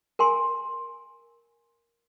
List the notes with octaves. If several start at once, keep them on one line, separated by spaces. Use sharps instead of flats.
A#4 G#5 C6